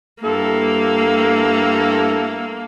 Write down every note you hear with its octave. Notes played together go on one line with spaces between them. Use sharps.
G2 A#3 E4 A4